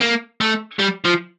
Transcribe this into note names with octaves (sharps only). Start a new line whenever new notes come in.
A#3
A3
G3
F3